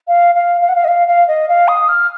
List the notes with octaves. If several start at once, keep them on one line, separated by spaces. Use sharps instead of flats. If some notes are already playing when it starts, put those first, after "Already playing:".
F5
F5
F5
F#5
F5
D#5
F5
F5
D#5
F5
D#6
F6